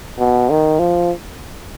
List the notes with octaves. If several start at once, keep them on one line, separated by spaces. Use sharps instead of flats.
B2
D#3
F3